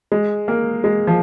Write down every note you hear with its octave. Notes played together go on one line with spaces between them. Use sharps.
G#3
A#3
G#3
F3